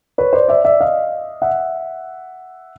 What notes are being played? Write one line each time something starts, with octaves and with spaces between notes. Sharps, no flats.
B4 C#5
C5 D5
D5 E5
D5 E5
D#5 F5
E5 F#5